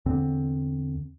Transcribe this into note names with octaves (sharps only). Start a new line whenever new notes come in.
E2 D3 C4